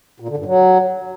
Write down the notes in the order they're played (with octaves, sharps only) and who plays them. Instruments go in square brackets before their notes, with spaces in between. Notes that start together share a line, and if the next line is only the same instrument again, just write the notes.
[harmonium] A#2
D3
G2
F#3